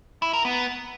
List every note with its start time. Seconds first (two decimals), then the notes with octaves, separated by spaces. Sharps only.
0.22 E4
0.33 A#4
0.45 B3